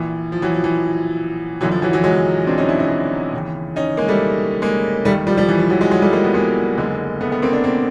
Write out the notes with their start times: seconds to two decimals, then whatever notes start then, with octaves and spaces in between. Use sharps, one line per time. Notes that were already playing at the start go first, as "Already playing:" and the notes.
Already playing: A#1 A#2 E3
0.32 F3
0.42 E3 F#3
0.54 F3
0.64 E3
1.61 G1 F#2 D3 E3 F#3
1.71 F3
1.82 E3 F#3
1.93 E3 F#3
2.04 F#3 G#3
2.47 C4 D4
2.58 C#4 D#4
2.69 D4 E4
2.79 C#4 D#4
3.33 D#2 C#3 E3
3.76 C#4 D#4
3.97 G#3 A#3
4.08 G3 A3
4.62 G#3 A#3
5.05 D#2 D#3 G3 A3
5.27 F3 G3
5.37 F3 G3
5.49 E3
5.59 F3
5.70 E3 F#3
5.81 F#3 G#3
5.91 F#3 G#3
6.02 G3 A3
6.13 G#3 A#3
6.24 A3 B3
6.34 G#3 A#3
6.78 F#1 F#2 D3 G#3 A#3
7.21 A3 B3
7.32 A3 B3
7.42 A#3 C4
7.52 C4 D4
7.64 A#3 C4